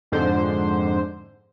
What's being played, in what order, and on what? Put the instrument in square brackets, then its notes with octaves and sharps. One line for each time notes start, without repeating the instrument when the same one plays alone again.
[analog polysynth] F2 G#2 D3 C5